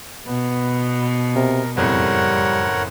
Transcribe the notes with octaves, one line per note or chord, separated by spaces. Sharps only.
B2 B3
C3 A#4
F#1 F2 A2 G3 A#4 C#5 F#5